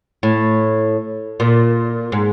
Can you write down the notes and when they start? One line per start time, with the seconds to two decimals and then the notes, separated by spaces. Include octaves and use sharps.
0.23 A2
1.40 A#2
2.12 G#2